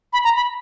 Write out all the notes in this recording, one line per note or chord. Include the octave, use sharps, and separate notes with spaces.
B5
A#5
B5